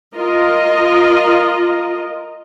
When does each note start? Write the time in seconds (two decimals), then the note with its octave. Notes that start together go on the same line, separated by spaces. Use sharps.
0.15 F4 A#4 D#5